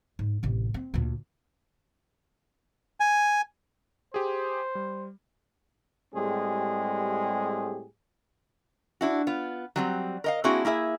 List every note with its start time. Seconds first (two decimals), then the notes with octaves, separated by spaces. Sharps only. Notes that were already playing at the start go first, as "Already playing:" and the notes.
0.19 G#2
0.43 A1 C3
0.74 C4
0.94 D2 A#2
3.00 G#5
4.14 G4 G#4 C5
4.75 G3
6.15 A2 G3 G#3 C4 G4 G#4
9.01 D4 E4 F#4
9.27 B3 F4
9.76 F#3 G3 C4
10.24 A#4 D#5 F5
10.44 A#3 C4 D4 E4 F#4 G#4
10.65 A#3 E4 G#4 E5